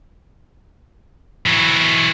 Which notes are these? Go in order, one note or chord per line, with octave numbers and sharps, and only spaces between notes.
E3 F#3